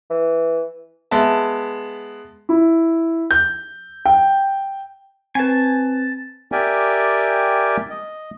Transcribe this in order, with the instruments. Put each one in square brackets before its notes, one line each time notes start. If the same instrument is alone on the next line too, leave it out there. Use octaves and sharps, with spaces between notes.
[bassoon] E3
[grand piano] G#3 B3 E5 A5
E4
G6
G5
[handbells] C4 B4 [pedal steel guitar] G#5 A5
[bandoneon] G4 A#4 D5 E5 G5 G#5
D#5